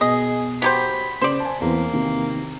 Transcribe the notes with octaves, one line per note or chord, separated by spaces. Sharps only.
B2 G#4 D#5
F#3 G4 C5 B5
C#3 C5 D5
G#5 A5
E2 E3 A#3 C4
C3 D#3